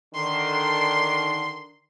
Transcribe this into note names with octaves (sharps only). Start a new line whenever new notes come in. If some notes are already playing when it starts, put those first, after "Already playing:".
D3 D#3 D4 C6